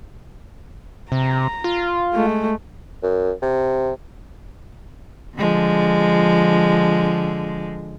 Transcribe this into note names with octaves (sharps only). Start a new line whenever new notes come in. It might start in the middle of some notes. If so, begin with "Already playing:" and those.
C3 A#5
F4
G#3 A3
F#2
C3
D3 F3 G#3